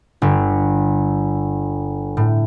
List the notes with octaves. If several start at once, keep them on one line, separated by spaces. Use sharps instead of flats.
G1
A2